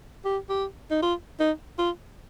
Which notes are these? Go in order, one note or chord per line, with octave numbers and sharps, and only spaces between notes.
G4
G4
D#4
F4
D#4
F4